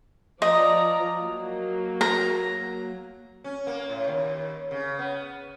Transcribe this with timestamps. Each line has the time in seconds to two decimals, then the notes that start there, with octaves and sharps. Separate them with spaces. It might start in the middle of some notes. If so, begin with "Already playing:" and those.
0.42 F3 D5 D#5 A#5
1.19 F#3 A#3
2.01 A#5
3.44 C#4
3.67 A#3
3.89 A2
4.08 D#2
4.71 C#3
4.99 B3